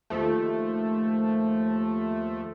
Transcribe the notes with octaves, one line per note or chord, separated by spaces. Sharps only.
D#2 F3 A3